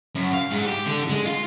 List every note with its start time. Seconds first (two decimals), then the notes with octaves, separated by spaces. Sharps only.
0.15 F#2
0.34 F5
0.51 G#2
0.66 G4
0.86 D3
1.09 G#3
1.26 F4